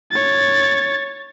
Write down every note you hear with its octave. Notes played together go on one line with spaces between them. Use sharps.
C#5 A6